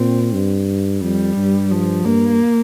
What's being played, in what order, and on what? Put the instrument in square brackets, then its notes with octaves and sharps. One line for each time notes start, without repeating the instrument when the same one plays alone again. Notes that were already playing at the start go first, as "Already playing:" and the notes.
Already playing: [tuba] A#2 [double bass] C4
[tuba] G2
[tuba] F2 [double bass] G3
[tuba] G2
[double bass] F3
[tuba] G2 [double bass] A#3